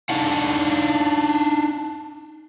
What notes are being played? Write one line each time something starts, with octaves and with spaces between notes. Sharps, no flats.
D4 D#4 F5 F#5